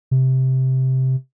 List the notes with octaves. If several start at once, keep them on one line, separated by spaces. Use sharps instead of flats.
C3